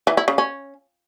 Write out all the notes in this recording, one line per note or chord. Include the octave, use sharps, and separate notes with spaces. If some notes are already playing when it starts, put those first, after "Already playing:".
E3
E4
C#3
C#4